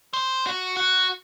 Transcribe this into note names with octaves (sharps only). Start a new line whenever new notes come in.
C5
F#4
F#4